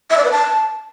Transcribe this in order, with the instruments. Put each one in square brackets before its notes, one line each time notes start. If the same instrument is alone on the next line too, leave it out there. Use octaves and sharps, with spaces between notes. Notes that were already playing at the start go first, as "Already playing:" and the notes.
[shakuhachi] E5
D5
B4
A5